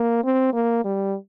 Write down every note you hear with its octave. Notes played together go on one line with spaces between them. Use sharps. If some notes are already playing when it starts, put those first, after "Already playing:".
Already playing: A#3
C4
A#3
G3